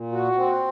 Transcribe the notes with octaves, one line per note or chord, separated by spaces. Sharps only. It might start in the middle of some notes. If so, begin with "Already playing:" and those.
Already playing: A#2
F#4
C4